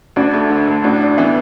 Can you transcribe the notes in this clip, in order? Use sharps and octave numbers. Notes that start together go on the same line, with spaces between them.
D2 D4 F#4
A3
D3
D2
A2 D4 F#4
D4
E3 B3 E4